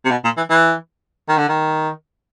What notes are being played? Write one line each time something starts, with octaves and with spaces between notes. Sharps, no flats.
C3
B2
A#2
E3
E3
D#3
D3
D#3